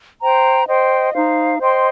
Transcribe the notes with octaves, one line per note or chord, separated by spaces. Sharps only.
C5 G5 A#5
C5 D#5 G5
D#4 C5 F5
C5 D#5 G5 C6